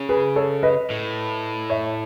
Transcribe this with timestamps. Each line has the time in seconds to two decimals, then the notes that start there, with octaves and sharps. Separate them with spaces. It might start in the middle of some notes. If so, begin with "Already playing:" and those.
Already playing: C#3
0.09 G#4 B4
0.36 A4 C#5
0.63 B4 D#5
0.90 A2
1.70 C#5 E5